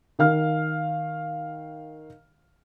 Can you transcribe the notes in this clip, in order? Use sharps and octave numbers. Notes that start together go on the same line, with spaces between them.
D#3 F5 F6